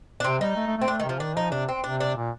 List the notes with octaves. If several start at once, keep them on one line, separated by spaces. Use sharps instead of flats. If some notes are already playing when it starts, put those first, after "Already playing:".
D4
C3 C4
G3 D#4
A3
A3
A3
C4
A3 D4
D#3
C3 F3
D#3 D4
F3 D#4
C3 D4
C4
C3 D4
D4
A#2